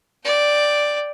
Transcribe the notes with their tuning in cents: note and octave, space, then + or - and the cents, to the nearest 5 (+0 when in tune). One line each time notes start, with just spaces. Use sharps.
D5 +0 G5 +0